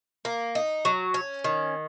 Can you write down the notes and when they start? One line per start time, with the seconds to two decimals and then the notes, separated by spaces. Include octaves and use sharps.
0.25 A#3
0.55 D#4
0.85 F#3
1.14 C#4
1.44 D#3